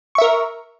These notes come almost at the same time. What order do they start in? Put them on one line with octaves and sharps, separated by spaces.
C#6 E5 A#4